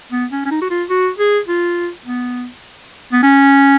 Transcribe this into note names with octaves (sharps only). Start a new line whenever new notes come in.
B3
C#4
C#4
D#4
F#4
F4
F#4
G#4
F4
B3
B3
C#4